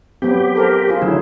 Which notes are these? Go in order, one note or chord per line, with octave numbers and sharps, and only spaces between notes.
F#3 B3 C4 G4
A4 A#4 C5
F4 G#4
D3 F#3 E4